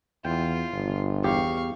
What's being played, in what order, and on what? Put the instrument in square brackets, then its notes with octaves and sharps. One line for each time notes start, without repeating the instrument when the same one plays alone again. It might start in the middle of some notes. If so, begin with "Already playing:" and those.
[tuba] E2 [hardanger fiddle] F4 [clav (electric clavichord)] G5
[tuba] G1
[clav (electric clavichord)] E2 G4 [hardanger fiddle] F5 C#6